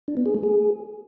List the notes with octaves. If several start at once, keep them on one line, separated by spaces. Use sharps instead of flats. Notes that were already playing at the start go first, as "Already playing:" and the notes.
D4
B3
G#4
A3
G#4